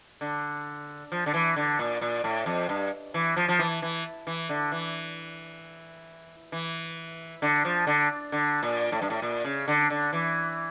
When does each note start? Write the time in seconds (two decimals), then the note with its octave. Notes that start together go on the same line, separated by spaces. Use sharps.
0.21 D3
1.12 F3
1.26 D3
1.34 E3
1.56 D3
1.79 A#2
2.01 A#2
2.24 A2
2.46 F2
2.69 G2
3.14 E3
3.37 F3
3.48 F3
3.59 E3
3.82 E3
4.27 E3
4.49 D3
4.72 E3
6.52 E3
7.42 D3
7.65 F3
7.87 D3
8.32 D3
8.63 A#2
8.92 A2
9.02 G2
9.10 A2
9.22 A#2
9.44 C#3
9.68 D3
9.90 D3
10.13 E3